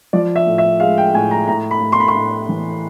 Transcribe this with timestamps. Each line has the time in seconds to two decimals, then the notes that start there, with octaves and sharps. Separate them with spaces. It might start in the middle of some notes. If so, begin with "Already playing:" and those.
0.13 F3 D5
0.36 E5
0.47 A2
0.58 E5
0.80 G#3 F5
0.98 G5
1.14 A2 G#5
1.31 A#5
1.48 A2 A#5
1.71 B5
1.81 A2
1.92 C6
2.00 B5
2.08 C6
2.15 A2
2.49 E3